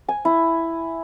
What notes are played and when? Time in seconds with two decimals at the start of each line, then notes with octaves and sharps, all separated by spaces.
0.08 G#5
0.25 E4